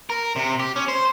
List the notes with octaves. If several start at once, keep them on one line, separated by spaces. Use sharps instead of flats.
A#4
C3
G4
C#4
C5